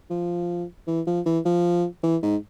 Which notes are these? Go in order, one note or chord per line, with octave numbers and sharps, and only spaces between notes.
F3
E3
F3
E3
F3
E3
G#2